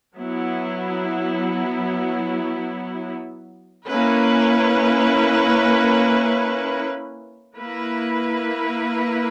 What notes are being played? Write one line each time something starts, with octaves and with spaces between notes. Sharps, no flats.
F#3 B3 E4
A#3 C#4 E4 B4
A#3 E4 B4